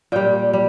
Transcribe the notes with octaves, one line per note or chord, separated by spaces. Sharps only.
A#2 G3 G5
G3